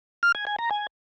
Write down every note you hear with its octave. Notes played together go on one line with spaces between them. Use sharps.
F6
G#5
G#5
A#5
G#5